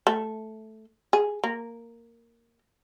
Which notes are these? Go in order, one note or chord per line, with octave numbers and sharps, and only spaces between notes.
A3
G#4
A#3